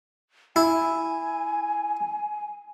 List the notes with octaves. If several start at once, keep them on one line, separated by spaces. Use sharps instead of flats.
E4 G#5